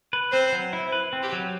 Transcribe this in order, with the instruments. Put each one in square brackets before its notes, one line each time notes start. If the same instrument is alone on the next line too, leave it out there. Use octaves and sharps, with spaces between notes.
[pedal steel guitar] B4
[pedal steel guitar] C4 [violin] C5
[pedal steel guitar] F#3
E4
B4
C4
[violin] G4
[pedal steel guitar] F#3